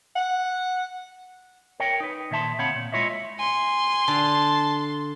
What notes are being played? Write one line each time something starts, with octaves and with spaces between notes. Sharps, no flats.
F#5
A#4 C#5 G5
D#4 B4
A#2 D#3 E5 A5 C6
D2 C4 C#5 F5 F#5 B5
A#2
G#3 E4 F4 C#5 D#5 E5
G#5 C6
D3 A5